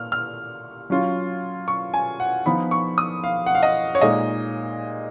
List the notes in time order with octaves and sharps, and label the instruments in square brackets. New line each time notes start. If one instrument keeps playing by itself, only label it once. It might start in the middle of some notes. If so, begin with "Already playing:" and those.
Already playing: [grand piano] A#2 F6
F6
F#3 C#4 F4
C#6
G#5
F#5
F3 B3 D#4 B5
C#6
D#6
F5
F#5
F5
D#5
C#5
A#2 G#3 D#4 D#5